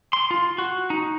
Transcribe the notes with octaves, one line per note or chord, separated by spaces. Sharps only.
C6
F4
F#4
D#4